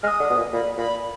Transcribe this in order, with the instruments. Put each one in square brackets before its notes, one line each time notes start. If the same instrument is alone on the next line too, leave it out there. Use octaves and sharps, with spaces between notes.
[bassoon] G#3 [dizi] F6
[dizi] D#6
[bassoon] D3
B2
A#2
[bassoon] A#2 [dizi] B5
[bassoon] A#2 [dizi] B5